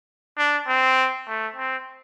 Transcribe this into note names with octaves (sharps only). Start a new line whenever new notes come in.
D4
C4
A3
C4